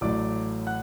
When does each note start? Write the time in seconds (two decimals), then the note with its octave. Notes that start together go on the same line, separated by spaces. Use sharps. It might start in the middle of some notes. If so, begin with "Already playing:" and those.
0.01 A1 A2 F#3 A3 D5 D6
0.67 F#5 F#6